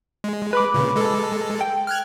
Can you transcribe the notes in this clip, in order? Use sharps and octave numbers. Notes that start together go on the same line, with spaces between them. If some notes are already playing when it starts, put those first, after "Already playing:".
G#3
B4 B5 D6
A#2 C#3
G#3 A4
G5
F6 F#6 G#6